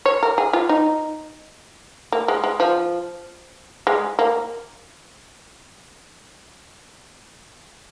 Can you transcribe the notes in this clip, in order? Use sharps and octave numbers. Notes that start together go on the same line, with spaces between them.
C#5
A#4
G#4
F4
D#4
A#3
G#3
G#3
F3
G#3
A#3